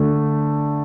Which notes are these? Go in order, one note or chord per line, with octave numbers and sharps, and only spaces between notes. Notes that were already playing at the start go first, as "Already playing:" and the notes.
Already playing: D3 A3 D4